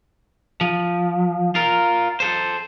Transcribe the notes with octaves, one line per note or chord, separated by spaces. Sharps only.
F3
F4 A#4
A4 C5